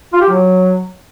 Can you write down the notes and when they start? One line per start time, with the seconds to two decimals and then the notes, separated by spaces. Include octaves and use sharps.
0.13 F4
0.21 G4
0.29 F#3